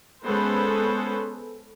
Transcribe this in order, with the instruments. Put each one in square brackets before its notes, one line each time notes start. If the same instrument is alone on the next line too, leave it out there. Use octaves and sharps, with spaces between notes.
[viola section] G#3 B3 C#4 A4 B4 C5